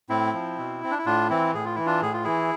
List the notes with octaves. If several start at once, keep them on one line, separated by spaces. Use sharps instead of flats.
A2 C4 E4
F3
B2
C4
D4
E4
A2 D4 F4
E3 C4 E4
A2 G#4
F4
E3 E4
D4 F4
A2 G#4
F4
E3 E4 G#4